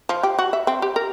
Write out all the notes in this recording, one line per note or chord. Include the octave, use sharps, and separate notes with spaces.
F3
G4
F#4
E5
C4
G4
A#4